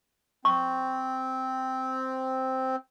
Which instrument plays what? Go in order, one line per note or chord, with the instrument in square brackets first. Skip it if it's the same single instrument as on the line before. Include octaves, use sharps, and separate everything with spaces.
[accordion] C4 [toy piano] C#6